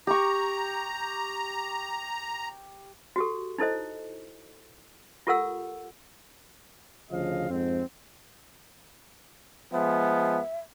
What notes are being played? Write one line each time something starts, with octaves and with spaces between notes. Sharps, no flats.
G4 A#5 C#6
F#4 G4 A4
D#4 E4 A4 C5 D#5
F4 G4 A4 A#4 F#5 E6
D2 C#3 F3 D#5 F5
F2 G#2 C4
F3 G#3 B3 E5